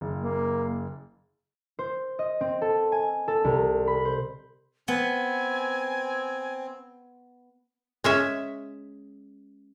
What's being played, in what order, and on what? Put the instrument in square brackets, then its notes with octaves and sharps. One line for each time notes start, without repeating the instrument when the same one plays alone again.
[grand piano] F#1
[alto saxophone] A#3
[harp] C5
D#5
C4
A4
G#5
A4
C2
B5
C5
[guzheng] B3 [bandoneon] C4 [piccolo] G#5
[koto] G#3 C#4 E5